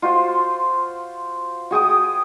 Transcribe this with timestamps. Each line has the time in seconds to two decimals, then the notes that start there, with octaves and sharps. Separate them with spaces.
0.02 F4 F#4 C5
1.71 F#4 G#4 G5 D#6